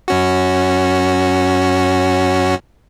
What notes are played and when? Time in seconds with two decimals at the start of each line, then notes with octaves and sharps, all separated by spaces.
0.08 F#2 C#4 F#4